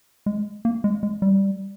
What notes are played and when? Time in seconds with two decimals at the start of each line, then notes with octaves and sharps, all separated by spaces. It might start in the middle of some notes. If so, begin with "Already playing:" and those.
0.26 G#3
0.65 A#3
0.84 G#3
1.03 G#3
1.22 G3